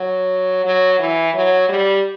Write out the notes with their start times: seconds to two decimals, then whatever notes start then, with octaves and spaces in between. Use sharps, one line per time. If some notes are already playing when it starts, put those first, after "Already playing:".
Already playing: F#3
0.65 F#3
0.99 E3
1.34 F#3
1.69 G3